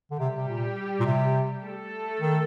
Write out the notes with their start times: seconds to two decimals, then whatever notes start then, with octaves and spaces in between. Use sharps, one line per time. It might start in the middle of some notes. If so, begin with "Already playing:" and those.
0.11 D3
0.19 C3 G3 G4
0.36 C3
0.48 A#2
1.00 A#2
1.06 C3
1.63 A3 A4
2.20 D#3